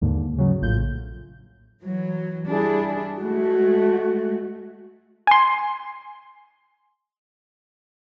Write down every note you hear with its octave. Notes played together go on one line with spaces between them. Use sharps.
D#2 G#2 D3
C#3 F#3
A#1 A2 F4 G6
E3 F#3
G3 D4 E4 G#4
G#3 A3 F#4
G#5 C6